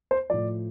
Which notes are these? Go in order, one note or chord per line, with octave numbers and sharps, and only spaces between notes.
C5
A2 F3 D5